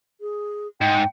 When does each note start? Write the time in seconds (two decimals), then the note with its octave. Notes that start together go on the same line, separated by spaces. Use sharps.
0.21 G#4
0.81 G#2 G5